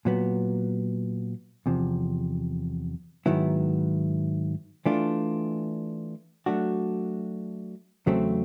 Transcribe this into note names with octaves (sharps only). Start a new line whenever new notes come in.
A#2 F#3 B3
E2 C3 F3
G#2 D#3 F#3 B3 E4
E3 A3 D4 F4
F#3 A3 D4 F#4
E2 C#3 F#3 A3 C4